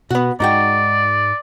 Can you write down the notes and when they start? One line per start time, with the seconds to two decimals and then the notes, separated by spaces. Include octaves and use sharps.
0.10 B2 B3 F#4
0.40 G#2 G#3 D#4 F#4 D5 G5